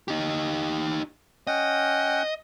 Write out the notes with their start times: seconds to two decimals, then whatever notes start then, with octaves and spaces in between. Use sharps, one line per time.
0.08 D#4 G4
1.47 C#4 D#5 F#5 G5